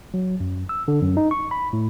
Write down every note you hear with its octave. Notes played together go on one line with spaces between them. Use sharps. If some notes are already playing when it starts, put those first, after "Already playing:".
F#3
F#2
E6
D3
F#2
D#4
C#6
B5
A2